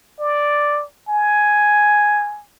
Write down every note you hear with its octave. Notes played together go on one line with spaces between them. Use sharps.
D5
G#5